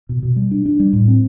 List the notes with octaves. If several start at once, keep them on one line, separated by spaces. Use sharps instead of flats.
B2
B2
G3
D4
D4
G3
A2
C4